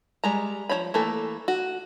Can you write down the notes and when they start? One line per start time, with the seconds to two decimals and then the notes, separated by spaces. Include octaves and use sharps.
0.24 G3 G#3 A#5
0.69 F3 D#4 C#5 B5
0.94 E3 A3 A#3 A4
1.48 F#4